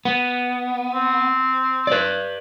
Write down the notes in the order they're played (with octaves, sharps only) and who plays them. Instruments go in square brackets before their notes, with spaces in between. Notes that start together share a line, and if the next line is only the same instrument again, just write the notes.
[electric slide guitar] B3
[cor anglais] C4
[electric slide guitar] B4 D5